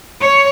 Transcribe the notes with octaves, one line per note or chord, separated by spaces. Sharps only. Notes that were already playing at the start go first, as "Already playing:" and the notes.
C#5